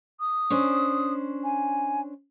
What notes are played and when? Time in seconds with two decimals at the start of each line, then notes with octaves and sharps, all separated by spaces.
0.20 D#6
0.50 C#4 D4 C5
1.44 G#5